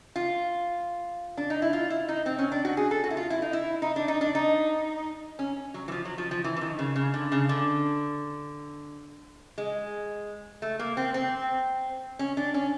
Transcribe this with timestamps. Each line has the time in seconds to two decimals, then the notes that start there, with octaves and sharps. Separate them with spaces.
0.16 F4
1.37 D4
1.50 D#4
1.62 E4
1.73 F4
1.90 E4
2.08 D#4
2.26 C4
2.38 C#4
2.52 D4
2.65 F#4
2.77 G#4
2.91 A4
3.04 F#4
3.10 E4
3.17 F4
3.30 E4
3.42 D#4
3.53 E4
3.82 D#4
3.96 D4
4.08 D#4
4.21 D4
4.35 D#4
5.39 C#4
5.74 F#3
5.88 E3
5.92 F3
6.05 F#3
6.18 F3
6.31 F3
6.44 E3
6.56 E3
6.61 D#3
6.79 C#3
6.96 C#3
7.14 D3
7.32 C#3
7.49 D3
9.58 G#3
10.62 A3
10.79 A#3
10.97 C4
11.14 C4
12.19 C#4
12.37 D4
12.54 C#4